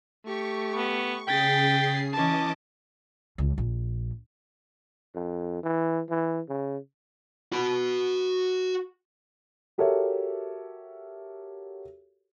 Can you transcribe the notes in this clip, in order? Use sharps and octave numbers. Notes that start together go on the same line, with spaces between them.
A3 G4 C#6
B3
C#3 G#4 G5 A6 B6 C7
E3 C#4 D#5 A5 D6
C#2
A#1
F2
E3
E3
C#3
F#4 B5
F#4 G4 A4 A#4 C#5 E5